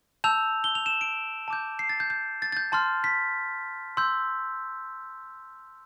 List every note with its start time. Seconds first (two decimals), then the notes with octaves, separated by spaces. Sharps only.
0.24 A5 E6 G6 F7
0.64 G7
0.75 F7
0.86 E7
1.01 D7
1.48 A5 D6 G6
1.79 C7
1.89 A6
2.00 G6
2.10 G6
2.42 A6
2.52 A6
2.57 G6
2.72 A5 C6 F6 A6
3.04 B6
3.97 C6 E6 G6